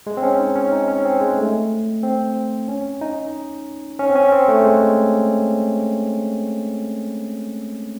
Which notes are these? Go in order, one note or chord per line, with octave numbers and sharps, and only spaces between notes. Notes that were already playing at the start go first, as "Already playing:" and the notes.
G#3
C4
C#4
D#4
C#4
D#4
C#4
C4
G#3
A3
C4
C#4
D#4
C#4
C4
C#4
C4
A3
G#3